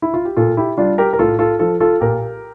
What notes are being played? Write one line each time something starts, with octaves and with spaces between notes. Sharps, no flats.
E4
F4
G4
A#2 F4 A4
E4 G4
G3 D4 F4
G4 A#4
A#4
A2 F4 A4
F4 A4
F3 F4 A4
F4 A4
A#2 G4 A#4